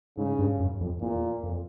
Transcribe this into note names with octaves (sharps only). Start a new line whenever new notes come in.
G#2 C#3
G2
F#2
F2
E2 A#2
F2